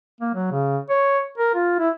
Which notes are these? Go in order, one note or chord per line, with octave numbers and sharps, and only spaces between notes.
A#3
F#3
C#3
C#5
A#4
F4
E4